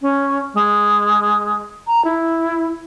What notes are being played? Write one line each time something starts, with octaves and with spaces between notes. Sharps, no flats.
C#4
G#3
A#5
E4